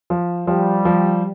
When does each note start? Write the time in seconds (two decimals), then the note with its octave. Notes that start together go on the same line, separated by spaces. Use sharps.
0.10 F3
0.47 F3 G3
0.85 F3